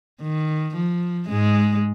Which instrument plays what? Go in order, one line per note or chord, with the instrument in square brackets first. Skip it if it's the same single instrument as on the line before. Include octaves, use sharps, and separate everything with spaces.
[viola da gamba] D#3
F3
G#2 G#3